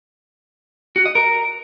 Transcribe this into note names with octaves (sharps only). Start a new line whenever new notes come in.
F#4
D#5
A#4